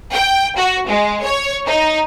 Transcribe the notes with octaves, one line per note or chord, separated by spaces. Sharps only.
G5
F#4
G#3
C#5
D#4